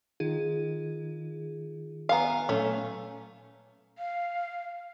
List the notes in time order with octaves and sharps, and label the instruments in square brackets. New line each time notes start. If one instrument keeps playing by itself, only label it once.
[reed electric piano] D#3 D#4 F4 [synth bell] G#4
[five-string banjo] B3 F5 [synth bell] G#5 A#5
[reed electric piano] A#2 F#3 [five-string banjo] A3 C#4
[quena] F5